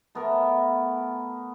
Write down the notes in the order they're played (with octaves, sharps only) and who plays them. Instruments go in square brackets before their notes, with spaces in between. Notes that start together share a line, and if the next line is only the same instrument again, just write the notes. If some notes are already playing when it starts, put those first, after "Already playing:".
[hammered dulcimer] A3 B3 A4 A#4